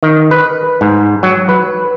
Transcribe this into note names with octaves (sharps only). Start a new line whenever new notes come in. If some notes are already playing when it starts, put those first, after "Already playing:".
D#3
B4
G#2
F#3
B4